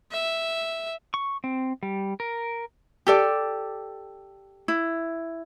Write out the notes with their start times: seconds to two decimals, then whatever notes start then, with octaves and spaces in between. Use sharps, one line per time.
0.11 E5
1.14 C#6
1.44 C4
1.83 G3
2.20 A#4
3.07 G4 A4 D5
4.68 E4